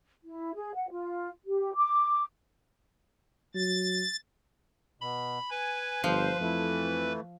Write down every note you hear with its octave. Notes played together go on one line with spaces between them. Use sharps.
E4
G#4
F#5
F4
G4
D6
F#3 A6
B2 B5
B4 G#5
G1 F3 C5
F2 E3 A3